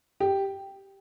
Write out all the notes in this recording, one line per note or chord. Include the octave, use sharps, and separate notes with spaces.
G4